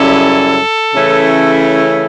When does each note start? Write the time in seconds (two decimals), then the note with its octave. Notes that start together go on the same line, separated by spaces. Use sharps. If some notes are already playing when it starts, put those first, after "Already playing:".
Already playing: F#2 C#3 G3 C#4 E4 A4
0.94 C#3 E3 A3 C#4 E4